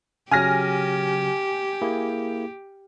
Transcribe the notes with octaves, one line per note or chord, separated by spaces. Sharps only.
C#3 F#3 G4 G#5 F6 A#6
A#3 E4 G#4